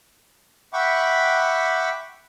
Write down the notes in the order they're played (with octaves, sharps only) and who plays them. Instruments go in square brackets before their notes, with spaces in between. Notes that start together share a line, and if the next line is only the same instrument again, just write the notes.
[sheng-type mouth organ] E5 F#5 G5 B5 C#6 D6